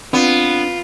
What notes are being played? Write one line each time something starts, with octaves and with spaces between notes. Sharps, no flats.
B3 C4 D4 F4 B4